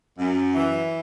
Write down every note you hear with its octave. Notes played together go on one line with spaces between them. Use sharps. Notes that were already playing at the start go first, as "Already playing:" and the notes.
F#2
E3